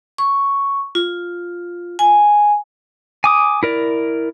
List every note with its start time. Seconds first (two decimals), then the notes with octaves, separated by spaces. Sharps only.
0.18 C#6
0.95 F4
1.99 G#5
3.24 G#5 D6 D#6
3.63 E4 A#4 D5